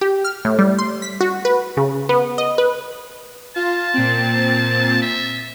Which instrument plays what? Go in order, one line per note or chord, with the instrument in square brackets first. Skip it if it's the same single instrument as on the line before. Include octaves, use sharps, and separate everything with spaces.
[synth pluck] G4
F6
A2
G3
C6
B6
F#4
B4
C#3
B3
D#5
B4
[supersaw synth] F4 [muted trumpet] A5
[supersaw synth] A#2 C4
[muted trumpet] E5